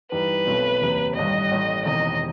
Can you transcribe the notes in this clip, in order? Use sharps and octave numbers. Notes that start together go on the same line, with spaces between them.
G2 E3 G3 D#4 B4
B1 B2 A3 C4
F#1 E2 C3
A1 G2 D#3 G3 D#5
A1 A2 G3
E1 E2 C3 D#3 D#5